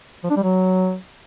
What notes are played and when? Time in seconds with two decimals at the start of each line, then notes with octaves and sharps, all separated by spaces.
0.24 F3
0.30 D4
0.37 G3
0.43 F#3